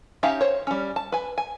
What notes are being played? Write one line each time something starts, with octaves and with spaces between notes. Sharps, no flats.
C#4 D#4 G4 E5 F5
C5 C#5
G3 C#4
A5
B4 G#5
G#5